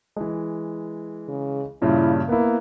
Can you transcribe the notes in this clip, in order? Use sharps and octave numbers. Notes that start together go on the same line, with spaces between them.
E3 G#3
C#3
G2 A#2 C#3 E4
A#3 B3 E4